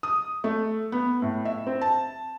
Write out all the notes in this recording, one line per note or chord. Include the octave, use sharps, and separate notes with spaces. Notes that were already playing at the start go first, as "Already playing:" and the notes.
D#6
A3
B3
A2
E5
C4
A5